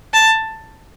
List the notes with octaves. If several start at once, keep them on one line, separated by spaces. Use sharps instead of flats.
A5